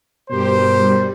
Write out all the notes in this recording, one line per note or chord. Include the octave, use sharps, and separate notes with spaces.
G2 B2 G4 A#4 C5
G3